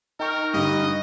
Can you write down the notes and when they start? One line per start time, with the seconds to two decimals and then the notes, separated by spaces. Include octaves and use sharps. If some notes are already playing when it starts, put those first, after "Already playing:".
0.20 D#4 A#4 G5 C#6
0.54 G2 D3 D#5